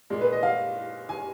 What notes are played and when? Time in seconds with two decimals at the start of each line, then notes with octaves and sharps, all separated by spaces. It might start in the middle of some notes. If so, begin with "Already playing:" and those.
0.10 A#2 G#3
0.21 B4
0.32 D#5
0.43 F5
1.09 G#5